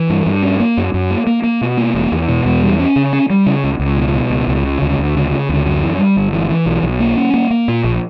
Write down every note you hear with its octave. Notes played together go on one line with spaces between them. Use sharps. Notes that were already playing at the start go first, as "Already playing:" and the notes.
Already playing: E3
G2
G2
C#4
A#3
F#2
F#2
A#3
A#3
A#3
B2
A#3
E1
E2
B2
E2
G3
C#4
C#3
C#4
G3
C#3
C#2
C#2
B2
B2
C#2
C#2
C#3
D2
D2
C#3
C#3
D2
F#2
E3
G3
G1
E3
E3
B1
B1
A#3
C#4
A#3
A#3
A#2
A#1